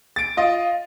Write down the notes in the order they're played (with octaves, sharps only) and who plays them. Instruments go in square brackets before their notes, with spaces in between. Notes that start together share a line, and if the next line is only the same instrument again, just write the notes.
[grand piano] A6 D7
F4 D#5